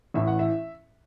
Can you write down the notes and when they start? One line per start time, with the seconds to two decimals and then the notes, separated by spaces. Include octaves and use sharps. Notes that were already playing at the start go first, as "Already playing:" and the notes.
0.14 A1 A2 E3 E5
0.27 F#5
0.39 E5